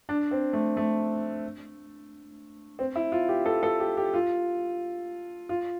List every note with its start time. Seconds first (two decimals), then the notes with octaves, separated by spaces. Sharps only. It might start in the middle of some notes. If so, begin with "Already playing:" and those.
0.09 D4
0.31 C4
0.53 A3
0.77 A3
2.79 C4
2.96 E4
3.12 F4
3.29 G4
3.46 A4
3.63 A4
3.80 G4
3.97 G4
4.14 F4
5.49 F4